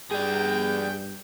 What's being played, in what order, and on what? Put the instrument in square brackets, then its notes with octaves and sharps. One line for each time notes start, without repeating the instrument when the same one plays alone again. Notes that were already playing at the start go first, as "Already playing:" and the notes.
[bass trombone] G2 [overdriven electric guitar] G#4 D5 [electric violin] G5